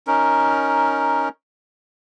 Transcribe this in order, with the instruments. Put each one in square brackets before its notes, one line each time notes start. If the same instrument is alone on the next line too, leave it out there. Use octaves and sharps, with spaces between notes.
[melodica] C#4 D#4 A#4